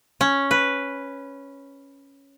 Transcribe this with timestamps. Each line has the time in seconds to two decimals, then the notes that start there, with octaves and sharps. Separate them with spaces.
0.21 C#4
0.51 B4